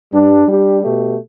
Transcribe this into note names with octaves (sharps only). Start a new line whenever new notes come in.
G2 G3 D4
G3 D4 G4
B2 A3 G4